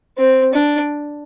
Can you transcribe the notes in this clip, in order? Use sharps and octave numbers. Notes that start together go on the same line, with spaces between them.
C4
D4